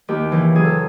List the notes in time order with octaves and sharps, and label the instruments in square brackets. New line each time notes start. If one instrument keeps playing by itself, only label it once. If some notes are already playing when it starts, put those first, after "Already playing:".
[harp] D#2 G4
C#3 E3
F#2 G#4
A4